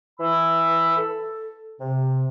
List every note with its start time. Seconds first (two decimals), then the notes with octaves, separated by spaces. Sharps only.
0.20 E3 B5 E6
0.97 A4
1.81 C3